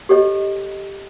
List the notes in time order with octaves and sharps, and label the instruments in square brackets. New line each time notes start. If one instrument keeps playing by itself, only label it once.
[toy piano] G4 A4 C#5 D#5